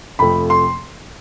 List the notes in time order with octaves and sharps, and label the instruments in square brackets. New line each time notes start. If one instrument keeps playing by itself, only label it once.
[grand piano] F2 C3 F3 A3 B5
C6